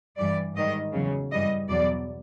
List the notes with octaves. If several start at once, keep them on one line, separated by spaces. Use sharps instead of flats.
G2 E3 G3 D5
G#2 D#3 G3 D#5
E2 C#3 F#3
G2 E3 G3 D#5
E2 B2 F#3 D5